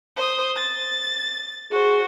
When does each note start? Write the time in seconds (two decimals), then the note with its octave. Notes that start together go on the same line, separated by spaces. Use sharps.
0.16 C5 D#6
0.55 A6
1.72 F#4 G#4 C5